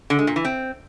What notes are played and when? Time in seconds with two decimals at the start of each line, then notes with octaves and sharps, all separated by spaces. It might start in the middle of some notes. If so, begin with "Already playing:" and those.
0.10 D3
0.19 G#3
0.27 A#2
0.36 E3
0.45 C4